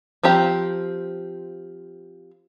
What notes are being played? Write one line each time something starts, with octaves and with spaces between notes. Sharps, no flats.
F3 C4 G4 A#5